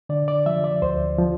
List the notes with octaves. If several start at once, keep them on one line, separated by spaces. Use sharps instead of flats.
D3 D5
D5
F3 E5
D5
D2 C5
F3